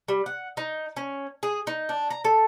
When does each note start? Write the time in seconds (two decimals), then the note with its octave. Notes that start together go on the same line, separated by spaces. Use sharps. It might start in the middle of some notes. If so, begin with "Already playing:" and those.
0.08 G3
0.26 F#5
0.57 D#4
0.97 C#4
1.43 G#4
1.67 D#4
1.89 D4
2.10 A#5
2.25 A4